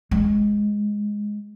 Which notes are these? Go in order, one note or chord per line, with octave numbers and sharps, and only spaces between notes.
G#3